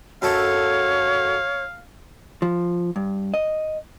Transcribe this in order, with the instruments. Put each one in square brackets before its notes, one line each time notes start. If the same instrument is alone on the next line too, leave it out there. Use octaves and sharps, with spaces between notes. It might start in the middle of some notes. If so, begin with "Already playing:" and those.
[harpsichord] F#2 A4 [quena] C#5 [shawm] F5
[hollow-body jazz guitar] F3
G2
D#5